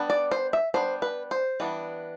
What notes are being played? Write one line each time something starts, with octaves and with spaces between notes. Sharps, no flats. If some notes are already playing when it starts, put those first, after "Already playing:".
Already playing: G3 B3 D4
D5
C5
E5
G3 B3 D4 C5
B4
C5
E3 G3 B3 D4